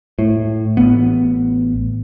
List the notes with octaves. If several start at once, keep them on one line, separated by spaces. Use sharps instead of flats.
A2
A1 B3